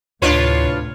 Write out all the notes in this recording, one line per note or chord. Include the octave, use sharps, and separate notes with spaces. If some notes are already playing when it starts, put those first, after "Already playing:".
D2 A2 C3 D4 F4 B4 C#5